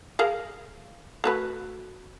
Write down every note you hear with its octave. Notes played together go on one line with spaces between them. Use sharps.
G#4 A#4 F5
A3 F#4 B4